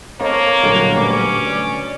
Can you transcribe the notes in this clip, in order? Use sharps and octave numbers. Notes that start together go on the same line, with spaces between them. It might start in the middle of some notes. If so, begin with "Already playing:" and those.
A#3 C4 A4 C#5 D#5
F#2 A#2 D3 F#3 G3 A4
D2 C#4 B4 D6
D5